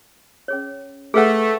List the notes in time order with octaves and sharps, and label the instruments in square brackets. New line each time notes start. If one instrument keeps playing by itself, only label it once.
[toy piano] C#4 G#4 C#5
[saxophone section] A3 [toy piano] G#4 B4 F#5